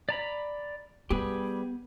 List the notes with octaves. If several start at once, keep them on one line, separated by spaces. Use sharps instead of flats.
D5 A#5 B5
G3 B3 G4 G#4 B4